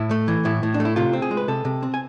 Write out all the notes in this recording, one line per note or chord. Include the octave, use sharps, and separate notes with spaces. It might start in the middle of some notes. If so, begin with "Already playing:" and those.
Already playing: A2 E4
A3
E3
A2 E4
A2
D4
A3
E4
C3 F4
C4
G#4
G#3
B4
C3 A4
C3
C4
G#5